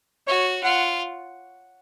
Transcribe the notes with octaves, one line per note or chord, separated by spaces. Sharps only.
F#4 C#5
F4 F#5